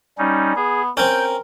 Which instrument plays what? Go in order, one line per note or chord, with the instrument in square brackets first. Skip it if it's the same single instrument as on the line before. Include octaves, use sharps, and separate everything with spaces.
[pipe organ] G3 C#4 D#4
[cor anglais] B3 [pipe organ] G#4
[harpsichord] C4 C#4 [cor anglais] A#4 [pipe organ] G5